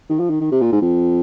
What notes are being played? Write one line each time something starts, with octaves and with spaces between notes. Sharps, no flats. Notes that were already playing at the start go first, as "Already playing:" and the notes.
D#3
F3
D#3
D#3
C3
A#2
G#2
F2